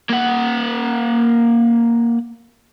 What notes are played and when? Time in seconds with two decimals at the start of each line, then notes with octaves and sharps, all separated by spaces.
0.09 A#3 F#5